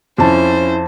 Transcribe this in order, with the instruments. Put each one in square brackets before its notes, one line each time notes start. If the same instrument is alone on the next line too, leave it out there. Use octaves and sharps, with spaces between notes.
[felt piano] F2 A5 [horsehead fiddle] C#4 E4 [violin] C5